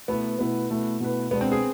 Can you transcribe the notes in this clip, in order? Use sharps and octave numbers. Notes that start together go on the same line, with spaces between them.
B2 A3 B3 E4 B4
B2 A3 B3 E4 B4
B2 A3 E4 B4
B2 A3 E4 B4
B2 G#3 B3 D4
C4
G#4